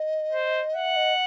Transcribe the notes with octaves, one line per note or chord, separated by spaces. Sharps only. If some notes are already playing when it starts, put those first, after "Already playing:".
Already playing: D#5
C5
E5 F#5
D#5